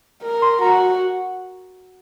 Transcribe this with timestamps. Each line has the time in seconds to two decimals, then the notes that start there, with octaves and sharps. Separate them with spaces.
0.22 A#4
0.42 C6
0.61 F#4 A#5